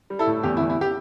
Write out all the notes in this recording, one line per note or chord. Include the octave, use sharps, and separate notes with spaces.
G3
E4 A4
A2
E2 G4
E4
E2
E4
G4